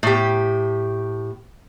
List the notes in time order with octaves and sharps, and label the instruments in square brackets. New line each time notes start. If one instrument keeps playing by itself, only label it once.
[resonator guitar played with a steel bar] A2 G4